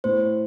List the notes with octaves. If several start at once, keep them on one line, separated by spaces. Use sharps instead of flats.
A2 C5